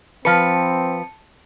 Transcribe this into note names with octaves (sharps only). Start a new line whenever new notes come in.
F3 C4 B4 A5 C#7